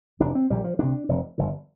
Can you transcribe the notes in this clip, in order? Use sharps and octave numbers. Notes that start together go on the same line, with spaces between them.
F1 F2 C3 D4
C4
A#1 A#2 G3
F3
D2 C3 D4
F1 F2 C3
G1 F2 D3